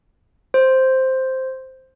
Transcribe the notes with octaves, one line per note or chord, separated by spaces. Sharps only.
C5